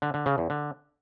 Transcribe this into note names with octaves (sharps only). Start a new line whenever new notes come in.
D3
D3
C#3
E2
D3